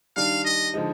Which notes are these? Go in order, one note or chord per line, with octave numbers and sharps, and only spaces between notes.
D#3 G3 D4 F5
D#5
D3 F3 G#3 D#4